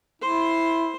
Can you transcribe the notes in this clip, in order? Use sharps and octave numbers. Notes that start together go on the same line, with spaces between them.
E4 C5 C6